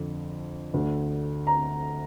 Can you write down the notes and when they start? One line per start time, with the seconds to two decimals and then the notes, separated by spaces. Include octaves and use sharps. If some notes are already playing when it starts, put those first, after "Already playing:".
Already playing: F2 D3 F3
0.74 D2 D3 A3
1.47 A#5